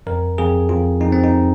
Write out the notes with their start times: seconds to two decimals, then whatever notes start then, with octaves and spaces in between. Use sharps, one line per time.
0.07 F2 A#4
0.38 F2 G#4
0.69 F2 F4
1.01 F2 D#4
1.12 C4
1.24 D#4